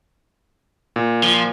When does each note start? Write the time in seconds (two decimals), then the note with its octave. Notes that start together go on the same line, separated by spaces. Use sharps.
0.96 A#2
1.24 F3